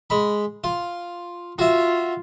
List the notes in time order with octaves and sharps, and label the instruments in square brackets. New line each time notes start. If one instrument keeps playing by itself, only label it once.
[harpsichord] G#3 B5
F4
[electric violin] F4 [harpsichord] F#4 E5